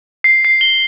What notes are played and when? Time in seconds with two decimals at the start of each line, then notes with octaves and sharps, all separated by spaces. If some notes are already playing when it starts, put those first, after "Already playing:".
0.24 C7
0.45 C7
0.61 G7